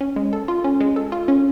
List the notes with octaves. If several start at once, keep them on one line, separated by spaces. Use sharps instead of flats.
C#4
G#3
A4
F4
C#4
G#3
A4
F4
C#4